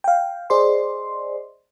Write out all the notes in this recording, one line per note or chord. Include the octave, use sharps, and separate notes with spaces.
F5 G5
G#4 C5 D5 D#5 C6